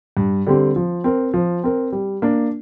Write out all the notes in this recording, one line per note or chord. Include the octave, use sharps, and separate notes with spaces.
G2
D3 G3 C4 G4
F3
C4 A#4
F3
C4 A#4
G3
A#3 D4